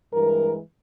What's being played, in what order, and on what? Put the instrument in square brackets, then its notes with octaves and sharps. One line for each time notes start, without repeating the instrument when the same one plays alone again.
[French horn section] G2 E3 G#3 A#4